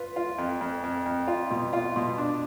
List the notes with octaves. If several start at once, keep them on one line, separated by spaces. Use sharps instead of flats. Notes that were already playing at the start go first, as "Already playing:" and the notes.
Already playing: F4 B4
F4
F2
F2
F2
F2
F4
B2
F4
B2
D4